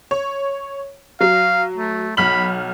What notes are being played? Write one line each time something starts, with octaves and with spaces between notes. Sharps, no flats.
C#5
F#3 F5
A3
B1 B5 F6 F#7